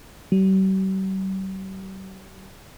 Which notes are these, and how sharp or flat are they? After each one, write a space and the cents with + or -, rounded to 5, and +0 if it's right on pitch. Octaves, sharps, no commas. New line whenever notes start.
G3 -45